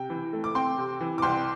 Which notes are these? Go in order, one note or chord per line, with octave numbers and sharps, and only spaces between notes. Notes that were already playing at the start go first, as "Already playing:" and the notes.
Already playing: C3 G5
E3
A3
D6
C4 G5 C6
C3
E3
D6
C2 G5 C6